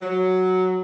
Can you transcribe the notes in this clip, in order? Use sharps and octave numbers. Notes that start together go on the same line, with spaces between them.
F#3